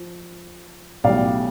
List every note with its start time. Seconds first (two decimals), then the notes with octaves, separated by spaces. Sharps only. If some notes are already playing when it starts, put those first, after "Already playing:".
Already playing: F3
1.04 B1 A2 E3 G3 D5 F5